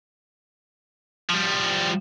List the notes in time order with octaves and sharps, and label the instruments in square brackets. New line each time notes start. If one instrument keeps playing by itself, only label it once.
[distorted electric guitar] F3 G3